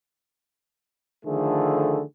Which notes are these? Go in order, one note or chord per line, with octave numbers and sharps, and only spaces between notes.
D3 D#3 F3 A3 G#4